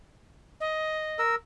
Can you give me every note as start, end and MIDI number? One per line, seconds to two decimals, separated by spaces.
0.60 1.21 75
1.19 1.35 70
1.19 1.35 88